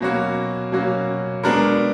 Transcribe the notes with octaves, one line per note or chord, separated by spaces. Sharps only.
B2 F#3 A#3 C#4 F#4
B2 F#3 A#3 C#4 F#4
G#3 B3 D4 F#4 A#4